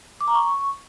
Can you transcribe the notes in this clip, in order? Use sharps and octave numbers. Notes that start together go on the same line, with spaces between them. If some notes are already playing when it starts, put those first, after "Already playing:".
D6
A#5
C#6